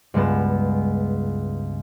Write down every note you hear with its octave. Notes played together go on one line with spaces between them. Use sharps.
C#2 G2 G#3 B3 E7